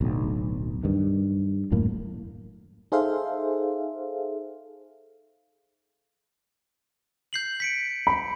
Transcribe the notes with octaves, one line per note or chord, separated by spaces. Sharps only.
D1 B1
G2 D#3
D#1 F#2 A2 A#3
D#4 G#4 A4 C5 E5 F5
G6 C7 F#7
B6 C#7 D7
B5